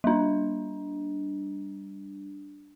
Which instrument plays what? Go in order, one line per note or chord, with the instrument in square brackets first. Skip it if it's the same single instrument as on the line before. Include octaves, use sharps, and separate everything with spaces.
[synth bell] G3 D4